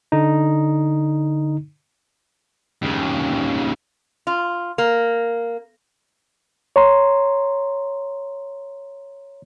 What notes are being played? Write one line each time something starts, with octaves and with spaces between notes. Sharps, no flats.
D3 D#4
D#2 C#3
F4
A#3
C#5 A#5 C6